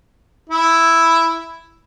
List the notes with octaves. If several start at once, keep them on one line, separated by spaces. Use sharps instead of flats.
E4